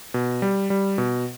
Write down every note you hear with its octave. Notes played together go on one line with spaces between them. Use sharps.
B2
G3
G3
B2